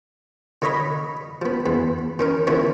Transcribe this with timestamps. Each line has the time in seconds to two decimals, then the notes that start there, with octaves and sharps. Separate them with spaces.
0.62 D3 D#4 C#5 D#5 B5
1.42 F3 B3
1.66 E2 B3
2.19 D#3 C#4 A#4
2.47 D3 E3 F3 B3 C#4